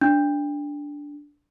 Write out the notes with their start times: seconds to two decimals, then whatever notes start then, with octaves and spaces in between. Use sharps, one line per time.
0.01 D4